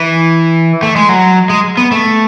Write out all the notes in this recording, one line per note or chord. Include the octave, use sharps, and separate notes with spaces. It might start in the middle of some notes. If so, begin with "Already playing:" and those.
Already playing: E3
A3
G#3
F#3
G#3
B3
A3